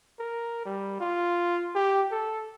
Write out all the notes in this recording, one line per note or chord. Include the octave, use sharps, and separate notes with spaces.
A#4
G3
F4
G4
A4